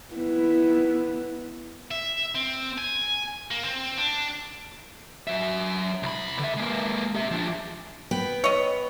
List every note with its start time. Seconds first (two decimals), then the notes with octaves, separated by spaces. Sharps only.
0.15 B3 E4
1.91 E5
2.35 C4
2.78 G#5
3.51 A#3
3.64 C4
3.98 D4
5.27 F#3 E5
6.03 C2 B5
6.39 D3 E5
6.57 G#3 A#3
7.15 G4 E5
7.31 F3 D4
8.11 B3 B4 G5
8.44 C#5 D#5